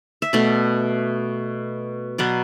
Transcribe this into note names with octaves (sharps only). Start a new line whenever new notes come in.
E5
B2 A3 D5
B2 F#3 B3 D5